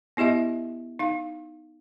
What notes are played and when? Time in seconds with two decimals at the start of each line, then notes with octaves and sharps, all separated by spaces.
0.17 B3 E4 G4 D#5 E5
0.99 D#4 F5